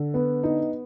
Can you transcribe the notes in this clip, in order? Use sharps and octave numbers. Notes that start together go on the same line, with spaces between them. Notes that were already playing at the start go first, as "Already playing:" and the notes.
Already playing: D3
B3
D#4